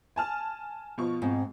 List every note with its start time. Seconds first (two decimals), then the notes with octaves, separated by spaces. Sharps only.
0.16 G#5 A5 F6
0.98 B2 F3 C#6
1.22 G#2 C4